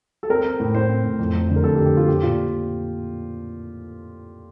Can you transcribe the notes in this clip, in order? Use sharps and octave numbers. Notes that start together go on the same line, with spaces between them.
A4
C4 A#4
C4
A2
A2 C5
C4
A2
F2
F2
D3
A#4
F2 A4
G4
D3
G4
F2 F4
C4 G4
A#2 F4